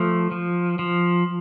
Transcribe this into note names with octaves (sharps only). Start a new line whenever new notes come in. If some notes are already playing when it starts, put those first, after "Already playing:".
Already playing: F3 A3
F3
F3